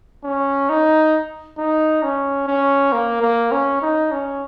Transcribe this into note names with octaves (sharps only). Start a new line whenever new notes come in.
C#4
D#4
D#4
C#4
C#4
A#3
A#3
C#4
D#4
C#4